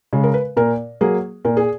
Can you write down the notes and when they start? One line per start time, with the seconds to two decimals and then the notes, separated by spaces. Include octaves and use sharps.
0.13 C#3 G#3
0.24 A#4
0.34 B4
0.56 A#2 A#4
1.01 F#3 A#3 G#4
1.45 A#2 A#4
1.57 G#4